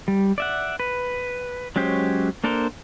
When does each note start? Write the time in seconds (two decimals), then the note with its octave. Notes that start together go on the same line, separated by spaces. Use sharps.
0.08 G3
0.38 D5 E5 F#5
0.80 B4
1.76 F#3 G#3 C#4 G4 C5
2.44 A#3 D4 A4 A#4 C5